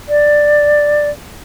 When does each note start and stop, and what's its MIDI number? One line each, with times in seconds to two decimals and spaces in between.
0.09 1.10 74